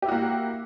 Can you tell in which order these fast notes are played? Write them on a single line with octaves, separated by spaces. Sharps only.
G4 E4 F#4 A#3